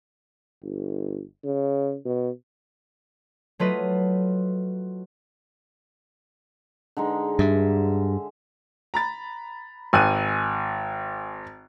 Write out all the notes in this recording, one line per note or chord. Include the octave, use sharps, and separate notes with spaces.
G1
C#3
B2
F#3 A3 F4 B4 D#5
D3 G#3 D#4
G2 E5
A#5 B5 A6
G#1 G#5 F#6 D#7